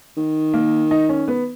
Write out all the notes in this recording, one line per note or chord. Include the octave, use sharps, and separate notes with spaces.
D#3
A#3
D#4
C#4
B3